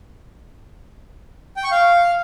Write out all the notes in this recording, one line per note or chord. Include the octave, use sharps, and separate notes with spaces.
G5
C#6
F5